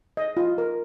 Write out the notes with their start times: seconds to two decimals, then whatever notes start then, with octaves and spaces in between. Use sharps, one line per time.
0.17 D#5
0.37 F4
0.58 A#4